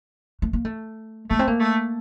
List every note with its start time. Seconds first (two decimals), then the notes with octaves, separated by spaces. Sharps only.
0.42 A3
0.53 A#3
0.65 A3
1.30 A3 A#3
1.39 C4
1.47 A#3
1.60 A3